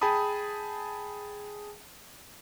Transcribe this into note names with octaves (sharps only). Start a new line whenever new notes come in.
G#4 G5 A5 B5 D#6